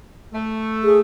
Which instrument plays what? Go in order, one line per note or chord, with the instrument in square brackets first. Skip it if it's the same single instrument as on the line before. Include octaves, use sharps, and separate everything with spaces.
[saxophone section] A3
[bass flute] G#4